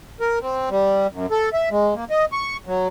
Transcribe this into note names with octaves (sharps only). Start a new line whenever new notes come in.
A#4
C4
G3
F#2
A4
E5
G#3
A#3
D#5
C#6
F#3